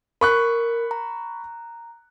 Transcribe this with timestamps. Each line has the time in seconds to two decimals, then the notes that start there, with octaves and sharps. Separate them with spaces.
0.21 A#4 B5 C#6 F#6
0.91 A#5